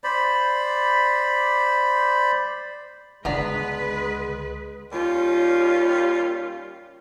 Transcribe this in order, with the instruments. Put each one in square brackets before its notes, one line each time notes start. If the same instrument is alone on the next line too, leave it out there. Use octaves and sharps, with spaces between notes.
[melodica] C5 D5 B5
[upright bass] C#2 D3 [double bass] G#3 [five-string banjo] B3 D4 A#5 [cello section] B4
[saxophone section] D#2 G3 C#4 F4